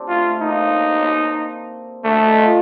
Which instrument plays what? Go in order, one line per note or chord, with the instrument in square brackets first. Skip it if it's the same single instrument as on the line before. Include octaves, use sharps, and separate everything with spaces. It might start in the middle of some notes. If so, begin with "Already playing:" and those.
Already playing: [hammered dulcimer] C4 D4 G4
[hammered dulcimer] A3 [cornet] F4
[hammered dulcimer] A#3 [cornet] D#4
[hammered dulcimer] C4
[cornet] A3 [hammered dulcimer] D4
[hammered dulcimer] D#4
F4